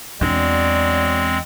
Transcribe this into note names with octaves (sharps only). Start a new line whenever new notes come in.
E2 F#3 G#3 C4 D4 D5